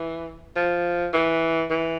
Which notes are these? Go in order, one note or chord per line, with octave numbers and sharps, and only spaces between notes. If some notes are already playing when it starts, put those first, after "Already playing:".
Already playing: E3
F3
E3
E3